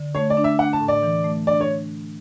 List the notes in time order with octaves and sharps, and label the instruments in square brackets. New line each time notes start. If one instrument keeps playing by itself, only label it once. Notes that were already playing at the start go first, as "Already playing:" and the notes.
Already playing: [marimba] D3
[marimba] A3 [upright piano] C#5
[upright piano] D5
[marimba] D4
[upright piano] E5
[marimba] D4 [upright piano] F#5
[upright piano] A5
[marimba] A2
[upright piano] D5
[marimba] E3
A3
[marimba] D4 [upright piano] D5
[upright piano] C#5